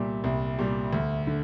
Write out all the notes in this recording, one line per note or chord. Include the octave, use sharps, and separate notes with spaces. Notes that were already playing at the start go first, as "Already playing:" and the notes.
Already playing: C2 A#2 G3 E5
C2
A#2 G3
D2
D3